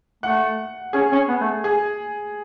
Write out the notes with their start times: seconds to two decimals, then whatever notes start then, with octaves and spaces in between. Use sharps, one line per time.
0.23 A3 F#5
0.93 C#4 G#4
1.12 C#4
1.29 B3
1.41 A3
1.64 G#4